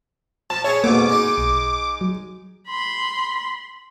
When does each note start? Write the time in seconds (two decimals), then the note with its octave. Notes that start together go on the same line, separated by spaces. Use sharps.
0.50 F3 A5
0.64 E4 G#4 C#5
0.84 F2 G#2 B2 A#3 D6
1.09 G#3 D#4
1.38 B1
2.01 F#3
2.68 B5 C6